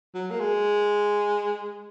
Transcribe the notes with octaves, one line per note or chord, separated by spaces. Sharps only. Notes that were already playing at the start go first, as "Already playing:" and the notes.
F#3
A#3
G#3